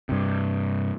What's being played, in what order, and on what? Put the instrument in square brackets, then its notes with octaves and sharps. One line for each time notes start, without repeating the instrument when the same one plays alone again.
[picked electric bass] G2 C3